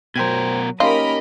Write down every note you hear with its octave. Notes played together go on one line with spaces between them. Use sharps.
B2 F#3 A#4 C5 G5 G#6
A#3 C#4 D#4 F4 G4 A#4 D#5 B5